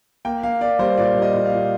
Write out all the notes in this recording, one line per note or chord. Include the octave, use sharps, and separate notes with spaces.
A#3 G5
A#3 F5
A#3 D5
G3 C5
A#2 D5
G3
D#5
A#2
F5
A#2